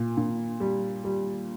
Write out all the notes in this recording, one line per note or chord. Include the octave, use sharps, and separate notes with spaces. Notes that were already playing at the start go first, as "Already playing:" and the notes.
Already playing: A#2
A#2
G3
G3